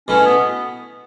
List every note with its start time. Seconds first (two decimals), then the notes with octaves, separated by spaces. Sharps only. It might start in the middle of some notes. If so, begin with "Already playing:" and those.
0.08 B2 A3 C#4 E4
0.25 B3